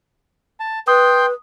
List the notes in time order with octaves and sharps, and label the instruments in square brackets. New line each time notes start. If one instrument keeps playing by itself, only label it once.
[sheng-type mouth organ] A5
[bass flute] B4 [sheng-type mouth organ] G5 C6 G6 [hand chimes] D#6